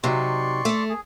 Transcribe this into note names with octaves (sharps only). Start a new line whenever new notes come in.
C3 F#3 D#4 D5 C6 C#6
A3 A4
G#4